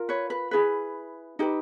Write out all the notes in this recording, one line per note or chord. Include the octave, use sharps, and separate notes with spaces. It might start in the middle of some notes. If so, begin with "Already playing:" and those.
Already playing: F4 A#4
B4 C#5
B4
E4 G#4 B4
D#4 G4 B4